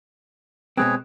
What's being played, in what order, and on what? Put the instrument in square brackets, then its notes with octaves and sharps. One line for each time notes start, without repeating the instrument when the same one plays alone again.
[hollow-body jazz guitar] B2 G#3 C4 [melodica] G#4 B4 C#5